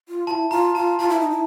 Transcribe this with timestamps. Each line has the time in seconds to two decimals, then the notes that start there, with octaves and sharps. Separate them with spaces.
0.09 F4
0.27 E4 F4 A5
0.51 F4 A#5
0.75 F4 A5
0.99 F4 A5
1.09 E4
1.20 D#4
1.30 E4